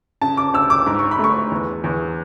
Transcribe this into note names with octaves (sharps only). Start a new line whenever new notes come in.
C#3 A5
D6
D2 E6
D6
G#2 D6
C#6
B5
A3 C#6
E2
E2